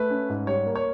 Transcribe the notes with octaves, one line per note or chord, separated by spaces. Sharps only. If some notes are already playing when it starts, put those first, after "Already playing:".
Already playing: A3 B4
C#4
G#2
G3 C#5
A#3
C#5